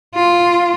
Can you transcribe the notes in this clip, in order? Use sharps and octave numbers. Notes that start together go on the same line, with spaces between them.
F4